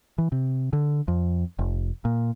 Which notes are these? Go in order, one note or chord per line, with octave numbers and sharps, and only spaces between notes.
E3
C3
D3
F2
F1
A#2